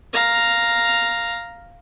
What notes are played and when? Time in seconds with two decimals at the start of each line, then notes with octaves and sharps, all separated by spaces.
0.13 F5 A#5